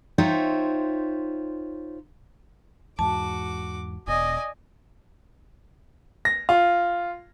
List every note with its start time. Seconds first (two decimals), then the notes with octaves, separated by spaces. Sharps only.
0.18 D#4 F4 C5 C#5 E5 G5
2.99 E2 G#2 F#4 A5 D6
4.08 E1 B2 D5 D#5 G#5
6.25 A#6
6.49 F4